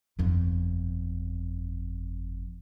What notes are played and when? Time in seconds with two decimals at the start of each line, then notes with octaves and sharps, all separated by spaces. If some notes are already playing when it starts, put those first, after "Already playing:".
0.19 G1 F2